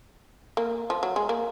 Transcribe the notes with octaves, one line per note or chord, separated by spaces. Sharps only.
A#3
F3
F#3
G#3
A#3